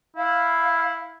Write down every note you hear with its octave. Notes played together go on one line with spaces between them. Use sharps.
E4 F5